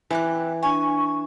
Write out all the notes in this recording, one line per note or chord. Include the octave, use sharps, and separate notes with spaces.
E3 C4 G4 F#6
D4 G#5 C#6